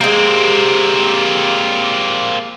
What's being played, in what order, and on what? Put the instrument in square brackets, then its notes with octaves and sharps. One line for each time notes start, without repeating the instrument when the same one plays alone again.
[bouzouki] G#3 G4 [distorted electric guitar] A#3 C4